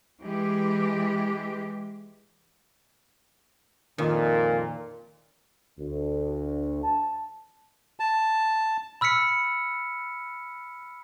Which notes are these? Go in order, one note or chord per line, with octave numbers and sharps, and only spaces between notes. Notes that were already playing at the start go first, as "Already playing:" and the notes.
E3 G#3 G4
F2 A#2 D#3
D2
A5
A5
B5 E6 F6 B6 C#7